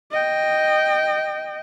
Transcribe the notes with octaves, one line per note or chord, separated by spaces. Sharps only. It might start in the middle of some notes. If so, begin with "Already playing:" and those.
D#5 G5